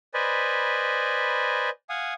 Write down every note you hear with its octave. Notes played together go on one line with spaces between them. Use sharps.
B4 C5 D5 D#5 G#5 B5
F5 F#5 G#5 D#6